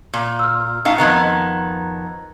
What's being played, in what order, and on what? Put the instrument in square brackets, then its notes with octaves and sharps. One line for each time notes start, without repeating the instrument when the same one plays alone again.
[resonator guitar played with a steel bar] A#2
[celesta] E6 F6
[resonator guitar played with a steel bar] A2 D#4 F5
[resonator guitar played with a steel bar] F2 D#3 B3 [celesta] A#5 F#6 G#6